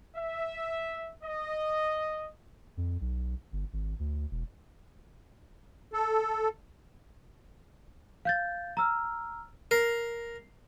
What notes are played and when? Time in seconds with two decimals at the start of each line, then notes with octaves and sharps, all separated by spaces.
0.16 E5
1.22 D#5
2.77 F2
3.01 B1
3.52 G1
3.73 G#1
3.99 D2
4.31 E1
5.93 A4
8.25 F5 G6 A6
8.77 A#5 E6 F6
9.71 A#4 C7